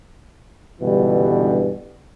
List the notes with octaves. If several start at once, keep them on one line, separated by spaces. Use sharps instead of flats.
C#2 G2 B2 D3 E3 G3